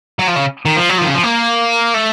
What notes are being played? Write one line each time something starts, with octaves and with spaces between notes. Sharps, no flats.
F#3
F3
C#3
D#3
F3
F#3
D#3 F3
C#3
F3
A#3
A3